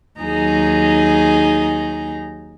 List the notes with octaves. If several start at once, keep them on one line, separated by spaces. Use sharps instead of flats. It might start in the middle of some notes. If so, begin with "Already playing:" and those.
D#2 F#3 D#4 G#4 A#5